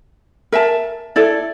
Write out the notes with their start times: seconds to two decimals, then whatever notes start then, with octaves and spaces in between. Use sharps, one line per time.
0.52 A#4 E5 A5
1.16 E4 A4 D5